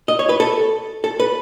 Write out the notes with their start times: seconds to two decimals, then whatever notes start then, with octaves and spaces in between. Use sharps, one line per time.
0.08 D#5
0.19 C#5
0.29 B4
0.40 A4
1.04 A4
1.20 B4